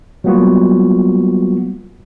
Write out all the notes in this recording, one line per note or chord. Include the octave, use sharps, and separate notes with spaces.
F#3 G3 A#3 B3 F4 F#4